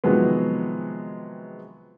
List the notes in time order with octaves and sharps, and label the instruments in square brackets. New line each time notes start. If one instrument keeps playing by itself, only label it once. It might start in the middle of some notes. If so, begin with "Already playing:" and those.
[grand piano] C3 D#3 F3 F#3 G#3 B3